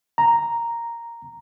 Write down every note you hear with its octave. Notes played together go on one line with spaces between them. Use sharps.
A#5